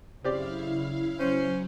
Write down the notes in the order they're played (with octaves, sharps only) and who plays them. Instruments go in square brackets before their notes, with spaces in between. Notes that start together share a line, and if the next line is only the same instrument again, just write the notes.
[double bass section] F#2 C#3 [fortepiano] C4 G4 D5 [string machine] E4 F5
[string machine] F#3 [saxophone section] C#4 C5